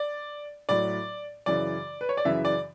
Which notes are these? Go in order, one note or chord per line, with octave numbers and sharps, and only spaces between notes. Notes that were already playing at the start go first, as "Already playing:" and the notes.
Already playing: D5
A2 F#3 D5
F#2 C#3 E3 D5
B4
C#5
D5
F#2 C#3 E3 E5
D5